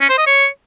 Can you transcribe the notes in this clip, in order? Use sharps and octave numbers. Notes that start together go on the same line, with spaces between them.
C#4
C5
D#5
C#5